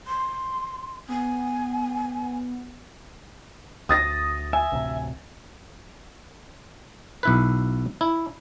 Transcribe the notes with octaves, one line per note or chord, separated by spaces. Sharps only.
C6
B3 G#5
D2 D#6 A6 A#6
E5 G#5
A1 D2 C3
B1 E4 B4
E4